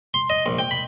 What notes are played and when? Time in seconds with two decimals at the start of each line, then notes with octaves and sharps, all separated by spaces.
0.14 C6
0.30 D#5
0.46 A#1
0.59 G5
0.71 B5